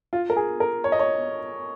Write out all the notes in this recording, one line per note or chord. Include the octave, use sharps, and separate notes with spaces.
F4
A#4
G#4
A#4
C#5
D#5
C#5